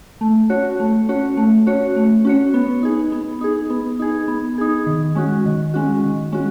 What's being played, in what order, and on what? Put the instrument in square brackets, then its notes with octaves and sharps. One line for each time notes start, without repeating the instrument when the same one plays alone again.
[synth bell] A3
C#4 F#4 C#5
A3
C#4 F#4 C#5
A3
C#4 F#4 C#5
A3
C#4 F#4 C#5
B3
D#4 G#4
B3
D#4 G#4
B3
D#4 G#4
B3
D#4 G#4
D#3
G#3 C#4 F#4
D#3
G#3 C#4 F#4
D#3
G#3 C#4 F#4